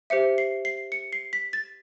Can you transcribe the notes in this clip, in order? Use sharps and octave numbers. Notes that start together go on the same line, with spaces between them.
G4 C5 E5 C#7
C7
C7
C#7
C7
B6
A6